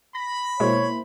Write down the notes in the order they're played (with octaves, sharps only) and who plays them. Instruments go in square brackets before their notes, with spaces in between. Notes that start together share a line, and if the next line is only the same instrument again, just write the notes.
[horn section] B5 [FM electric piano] A#6
[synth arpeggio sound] B2 G#3 [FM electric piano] A#3 E4 C5 [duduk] C#5